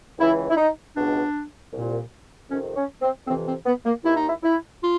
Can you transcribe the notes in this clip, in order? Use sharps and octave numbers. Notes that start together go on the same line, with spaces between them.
C#2 C#3 E3 E4
E4
D#4
C#2 B2 D4
C2 A#2
F2 C3 D#3 C#4
C#4
C4
F2 C3 E3 C4
C4
B3
A#3
D#2 D#3 E4
D#4
E4
E4
F4